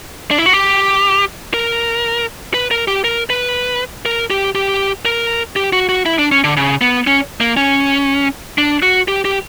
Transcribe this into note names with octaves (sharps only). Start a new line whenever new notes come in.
D4
E4
F#4
G4
A#4
B4
A#4
G4
A#4
B4
A#4
G4
G4
A#4
G4
F#4
F#4
E4
D4
C#4
D3
C#3
B3
C#4
A#3
C#4
D4
F#4
G4
G4